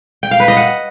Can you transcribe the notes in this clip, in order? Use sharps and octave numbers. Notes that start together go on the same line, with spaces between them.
G5
F5
B4
D#5
F#5